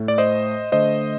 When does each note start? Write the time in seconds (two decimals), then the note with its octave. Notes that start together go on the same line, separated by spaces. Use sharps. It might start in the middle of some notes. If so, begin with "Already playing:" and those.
Already playing: A2 A3
0.08 D5
0.18 C5 D#5
0.72 D3 A3 C5 D#5